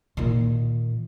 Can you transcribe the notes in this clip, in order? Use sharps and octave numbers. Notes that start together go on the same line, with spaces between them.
A#2 D#3